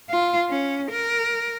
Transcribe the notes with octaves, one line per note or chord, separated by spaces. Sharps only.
F4
C#4
A#4